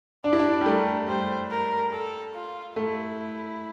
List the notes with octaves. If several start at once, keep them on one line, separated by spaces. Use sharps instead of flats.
D4 D5
E4
D4
G3
A3 A#4
G3 C5
A#4
A4
F4
A3 E4